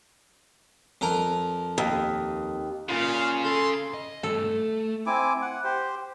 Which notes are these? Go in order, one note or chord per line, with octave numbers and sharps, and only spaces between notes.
F2 A#4 A#5
D#2
A#2 C#3 F4 F5
A4 B5 C6
D#5
G2 A3 A4
A3
C4 E4 G#5 D6
F#5
G4 C5